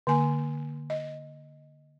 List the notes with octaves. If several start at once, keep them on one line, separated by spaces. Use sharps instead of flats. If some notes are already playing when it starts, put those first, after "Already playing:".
D3 A#3 G#5
D#5